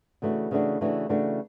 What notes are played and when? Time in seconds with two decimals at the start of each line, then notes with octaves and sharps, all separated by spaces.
0.22 C#3 E3 A3 D4 F#4
0.51 C#3 E3 A3 D4 F#4
0.81 C#3 E3 A3 D4 F#4
1.09 C#3 E3 A3 D4 F#4